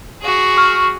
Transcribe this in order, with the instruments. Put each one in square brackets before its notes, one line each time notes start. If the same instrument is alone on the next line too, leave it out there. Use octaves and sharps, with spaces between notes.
[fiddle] F#4 G#4
[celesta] C#6 F6